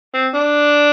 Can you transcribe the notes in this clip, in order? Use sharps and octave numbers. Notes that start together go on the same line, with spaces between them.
C4
D4